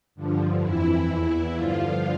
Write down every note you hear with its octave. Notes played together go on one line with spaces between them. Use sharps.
G2 D3 F3
F2 E3 E4
E2 E3 E4
G2 D3 F3 F4